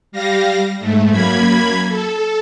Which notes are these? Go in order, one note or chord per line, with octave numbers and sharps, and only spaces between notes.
G3 F5 A#6
G#2 A3
F#2 A#3 B5 G#6
A4